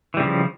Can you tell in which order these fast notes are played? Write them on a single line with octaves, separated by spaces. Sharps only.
E3 G3 C#3 F3